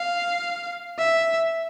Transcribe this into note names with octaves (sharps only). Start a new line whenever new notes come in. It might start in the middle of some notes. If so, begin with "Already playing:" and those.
Already playing: F5
E5